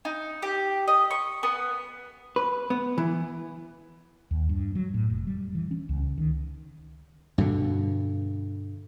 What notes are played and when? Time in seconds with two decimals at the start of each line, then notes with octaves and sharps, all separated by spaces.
0.05 D#4
0.42 G4
0.88 D#5
1.11 C#6
1.43 B3
2.36 B4
2.70 B3
2.98 E3
4.31 D#2
4.49 G2
4.75 F#3
4.94 A2
5.10 F1
5.27 G3
5.55 E3
5.71 C#4
5.89 C#2
6.18 D#3
7.38 G2 B2 D3